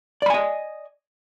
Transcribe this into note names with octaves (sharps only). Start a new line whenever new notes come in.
D5 D#5 G#5 B5